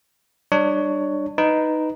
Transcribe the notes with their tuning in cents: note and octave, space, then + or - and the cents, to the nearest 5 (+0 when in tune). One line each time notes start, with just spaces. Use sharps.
G3 +0 D4 +25 C#5 +10
D#4 +0 B4 +5